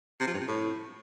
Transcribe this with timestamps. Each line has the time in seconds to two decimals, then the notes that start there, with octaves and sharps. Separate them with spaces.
0.20 C3
0.27 F3
0.34 G2
0.41 C3
0.48 A2